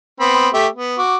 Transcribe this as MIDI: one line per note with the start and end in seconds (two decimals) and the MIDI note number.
0.20 0.48 59
0.20 0.48 60
0.20 0.48 83
0.54 0.67 57
0.54 0.67 67
0.54 0.67 76
0.75 0.97 59
0.98 1.17 66
0.98 1.17 86